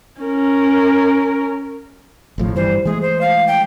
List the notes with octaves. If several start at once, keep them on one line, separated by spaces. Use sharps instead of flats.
C#4 A#4
G#1 A2 F3
G2 E3 G3 C5
E3 G#3 A3 G#4
C5
F5
G5